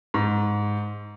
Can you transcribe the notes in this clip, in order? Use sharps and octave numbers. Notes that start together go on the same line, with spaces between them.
G#2